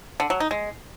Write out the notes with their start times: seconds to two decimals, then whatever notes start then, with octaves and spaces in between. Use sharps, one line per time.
0.20 D3
0.30 F#3
0.40 D#4
0.51 G#3